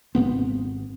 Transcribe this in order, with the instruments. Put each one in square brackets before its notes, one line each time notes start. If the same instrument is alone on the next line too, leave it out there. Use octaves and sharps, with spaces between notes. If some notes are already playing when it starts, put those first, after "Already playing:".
[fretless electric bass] G#1 B2 B3 C4